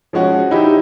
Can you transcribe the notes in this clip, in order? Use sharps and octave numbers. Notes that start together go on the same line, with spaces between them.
F3 G#3 C#4 F#4
D#4 E4 G4